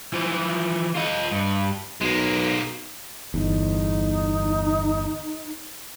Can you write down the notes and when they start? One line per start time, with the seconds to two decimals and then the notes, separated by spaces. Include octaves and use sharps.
0.13 E3 F3
0.95 F4 D#5
1.31 G2
2.01 B1 G#3 A#3
3.34 G1 E2 D#4